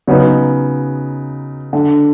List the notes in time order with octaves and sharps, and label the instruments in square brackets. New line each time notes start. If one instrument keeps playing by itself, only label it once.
[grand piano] C#3 [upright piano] F#3 B3 D#4
[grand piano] D3